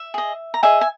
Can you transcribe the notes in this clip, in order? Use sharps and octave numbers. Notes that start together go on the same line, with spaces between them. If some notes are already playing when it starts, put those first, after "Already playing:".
Already playing: E5
G#4 D#5
A#5
G#4 D#5 E5 G#5
G#5